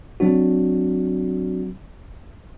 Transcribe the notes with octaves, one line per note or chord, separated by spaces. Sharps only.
F#3 C4 D4 F#4